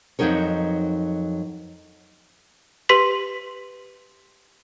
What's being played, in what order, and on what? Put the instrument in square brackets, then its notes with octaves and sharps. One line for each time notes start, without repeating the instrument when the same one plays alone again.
[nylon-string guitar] F2 C#3 F#3 D#4 A#4 C#5
[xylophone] G4 B4 C6 B6 F#7